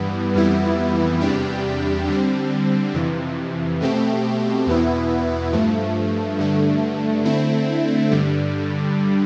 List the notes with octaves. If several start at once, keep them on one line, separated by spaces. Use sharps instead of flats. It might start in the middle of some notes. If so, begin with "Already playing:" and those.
Already playing: G2 E3 G3 B3
F2 E3 G3 B3 E4
E2 C3 G3 D4 G4
D3 G3 C4
F2 C3 E3
B2 A3 C4 G4
E2 B2 B3 E4
G2 F3 A3
G2 D3 A3
D3 A3 C4 E4
G2 D3 G3